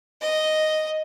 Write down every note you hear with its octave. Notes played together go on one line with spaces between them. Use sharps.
D#5